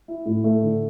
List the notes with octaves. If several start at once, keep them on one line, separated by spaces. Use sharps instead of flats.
E4
A2
A3
D3